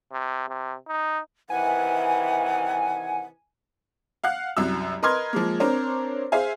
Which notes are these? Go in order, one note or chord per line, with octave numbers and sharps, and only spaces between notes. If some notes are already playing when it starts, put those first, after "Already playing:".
C3
C3
D#4
C3 D#3 E3 F#5 G#5
F5 F#5 F#6
C2 F#2 E6
A#4 B4 D#5 C6 F6 G#6
F3 G#3 A#3
C4 D4 A#4 C5 C#5
G#4 C5 E5 F5 G#5